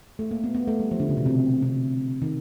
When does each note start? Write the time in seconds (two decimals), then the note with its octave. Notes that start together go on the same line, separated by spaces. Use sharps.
0.19 A3
0.31 A#3
0.44 B3
0.55 B3
0.68 A3
0.80 G3
0.91 F3
1.00 D3
1.09 C#3
1.17 B2
1.26 C3
1.62 C3
2.22 D#3